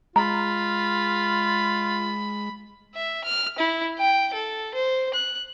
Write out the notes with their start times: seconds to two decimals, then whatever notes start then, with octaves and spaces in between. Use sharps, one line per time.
0.16 G#3 F4 A#5 B5
2.95 E5
3.24 F6
3.59 E4
3.99 G5
4.34 A4
4.74 C5
5.14 F#6